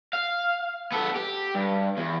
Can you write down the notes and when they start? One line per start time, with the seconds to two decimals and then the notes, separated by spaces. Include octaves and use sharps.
0.13 F5
0.92 B3 A4
1.16 G4
1.55 G2
1.97 E2